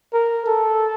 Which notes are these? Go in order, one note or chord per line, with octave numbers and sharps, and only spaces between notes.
A#4
A4